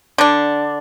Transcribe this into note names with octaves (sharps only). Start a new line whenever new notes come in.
D3 D4